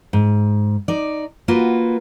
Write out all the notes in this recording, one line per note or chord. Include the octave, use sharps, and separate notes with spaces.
G#2
D#4 D5
A#3 F4 F#4 B4